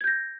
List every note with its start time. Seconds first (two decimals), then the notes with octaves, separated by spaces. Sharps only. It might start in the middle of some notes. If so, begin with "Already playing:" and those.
0.01 G#6
0.04 G6
0.07 A#6